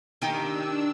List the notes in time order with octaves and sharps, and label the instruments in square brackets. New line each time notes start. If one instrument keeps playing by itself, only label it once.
[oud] D#3 D#4 G4 [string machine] D4 E6